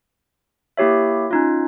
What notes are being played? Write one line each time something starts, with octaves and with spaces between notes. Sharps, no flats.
A#3 E4 G4 C#5 E5
C#4 D#4 F4